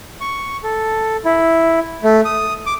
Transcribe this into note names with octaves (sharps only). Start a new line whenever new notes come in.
C#6
A4
E4
A3
D#6
D6